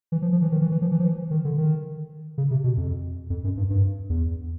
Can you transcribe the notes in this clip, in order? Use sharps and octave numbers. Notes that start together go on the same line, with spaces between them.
E3
F3
F3
E3
D#3
E3
E3
F3
E3
F3
E3
D#3
D3
D#3
C#3
C3
B2
F2
F2
F#2
G2
G2
E2